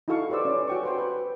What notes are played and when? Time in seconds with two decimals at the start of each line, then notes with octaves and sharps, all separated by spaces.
0.08 D#4 E4 F#4 A4 F5 C#6
0.30 G4 B4 C5 D5 E6
0.45 C#4 D5
0.68 F#4 G5 C#6
0.83 B4 C5 G5
0.98 B4